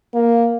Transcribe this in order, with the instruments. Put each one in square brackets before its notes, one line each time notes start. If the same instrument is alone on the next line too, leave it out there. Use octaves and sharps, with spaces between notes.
[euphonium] A#3